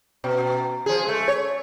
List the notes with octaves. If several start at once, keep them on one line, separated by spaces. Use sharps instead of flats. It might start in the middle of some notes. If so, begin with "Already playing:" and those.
B2
F3 G#4
G#3 A3
C#5